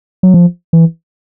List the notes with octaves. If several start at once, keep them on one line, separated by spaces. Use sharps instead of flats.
F#3
F3
E3